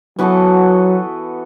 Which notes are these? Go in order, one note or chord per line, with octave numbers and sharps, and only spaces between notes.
E3 F#3 B3 F#4 A4